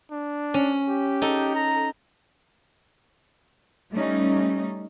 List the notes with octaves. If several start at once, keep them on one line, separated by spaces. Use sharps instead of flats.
D4
C#4
G4
D#4 A4
A#5
G3 A3 C#4 D#4